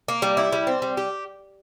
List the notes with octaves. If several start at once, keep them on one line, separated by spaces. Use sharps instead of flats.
A#3
G3
E4
G3
C4
G3
G4